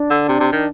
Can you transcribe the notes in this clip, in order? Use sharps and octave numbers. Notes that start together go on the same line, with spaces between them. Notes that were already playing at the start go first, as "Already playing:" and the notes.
Already playing: D4
D3
C3
C3
D#3